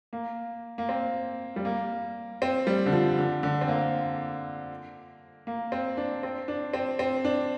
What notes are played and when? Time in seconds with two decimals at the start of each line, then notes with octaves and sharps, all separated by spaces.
0.13 A#3
0.78 A#3
0.89 C4
1.56 G3
1.65 A#3
2.42 C4
2.67 G3
2.86 D3
2.92 F3
3.18 D3
3.43 D3
3.61 C4
3.68 A#3
5.47 A#3
5.72 C4
5.97 D4
6.23 C4
6.48 D4
6.73 C4
6.99 C4
7.25 D4